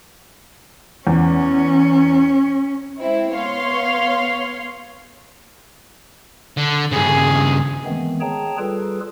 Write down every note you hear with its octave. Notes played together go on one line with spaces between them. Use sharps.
E2 C#4
G#3 C4 E4
B3 C#5 F5 C6
D3
G2 C#3 G#4
D#3 E3 G#3 A3 B3 C4
G#4 C#5 G5 A5 A#5
G3 F4 G#4 A4 B4